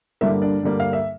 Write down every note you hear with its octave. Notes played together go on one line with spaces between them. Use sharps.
G2 D3 G3 A#3 E4 E5
D4 D5
G2 D3 G3 A#3
F5
E5